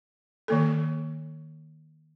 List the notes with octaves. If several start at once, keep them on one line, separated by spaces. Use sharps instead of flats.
D#3 A#3 A4